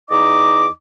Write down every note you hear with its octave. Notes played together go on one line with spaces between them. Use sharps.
E2 D#4 D#5 D6